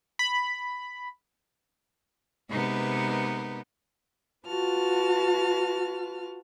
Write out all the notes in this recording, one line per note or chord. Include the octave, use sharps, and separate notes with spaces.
B5
C3 G#3 B3 D#4 A#4 B4
F4 F#4 B4 A5 F6